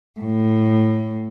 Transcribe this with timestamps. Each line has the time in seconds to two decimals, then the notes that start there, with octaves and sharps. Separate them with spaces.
0.19 A2